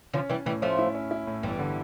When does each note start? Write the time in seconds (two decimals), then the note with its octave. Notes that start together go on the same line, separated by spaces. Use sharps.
0.13 D3 F3 C#4
0.30 E3 G3 C#4
0.46 A2 E3 G3
0.62 F3 A3 C#4
0.79 E4
0.95 C#4
1.11 E4
1.27 A2
1.43 G1 E3 G3
1.59 D3